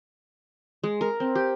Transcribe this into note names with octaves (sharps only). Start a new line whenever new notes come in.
G#3
A#4
C4
G4